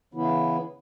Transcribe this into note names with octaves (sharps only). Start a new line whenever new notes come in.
C#3 E3 B3 E4